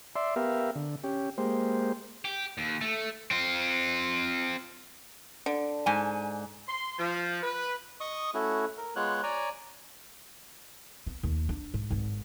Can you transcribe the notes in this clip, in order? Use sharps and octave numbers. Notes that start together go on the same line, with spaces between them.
D5 E5 C6
B3 G4 A#4 E5 F5
D3
C#4 G4
G#3 A#3 G4 C5
G4
D#2
A3
C4 F4
D3
G#2 G#5
C6
F3
B4
D#5 C#6 D#6
A3 C#4 E4 F#4
A#4
G#3 B3 F4 C#5 F#6
C#5 D5 G#5 A#5
B3
D#2
D4
G#2
G#1 B3